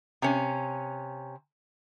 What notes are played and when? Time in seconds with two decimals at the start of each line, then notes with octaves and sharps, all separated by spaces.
0.22 C3 C#4